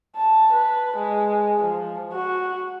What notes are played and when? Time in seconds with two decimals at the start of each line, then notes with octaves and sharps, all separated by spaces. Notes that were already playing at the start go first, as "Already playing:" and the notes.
0.16 A5
0.53 B4
0.96 G#3
1.59 F3
2.13 F#4